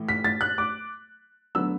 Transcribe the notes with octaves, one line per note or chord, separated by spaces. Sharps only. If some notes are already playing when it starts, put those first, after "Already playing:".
Already playing: A2 E3
B6
A6
F#6
D6
D3 F#3 B3 E6